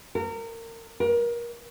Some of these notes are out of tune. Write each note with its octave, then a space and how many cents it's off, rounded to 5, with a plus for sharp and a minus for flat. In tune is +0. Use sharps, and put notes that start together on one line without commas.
A#4 -30
A#4 +25